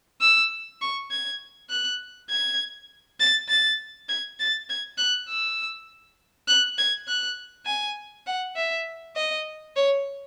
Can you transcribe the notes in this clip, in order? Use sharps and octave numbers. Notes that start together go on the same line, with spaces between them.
E6
C#6
G#6
F#6
G#6
A6
A6
G#6
A6
G#6
F#6
E6
F#6
G#6
F#6
G#5
F#5
E5
D#5
C#5